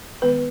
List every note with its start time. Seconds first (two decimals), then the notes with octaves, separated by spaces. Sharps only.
0.22 D#3 G#3 B3 B4